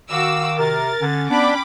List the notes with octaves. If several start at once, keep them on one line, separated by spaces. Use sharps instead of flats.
D#3 F#4 F5 D6 E6
C3 A#4 A6
D3 C#4
B3 D4 G5 B5 D6